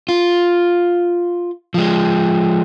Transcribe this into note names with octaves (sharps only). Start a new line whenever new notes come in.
F4
F3 G#3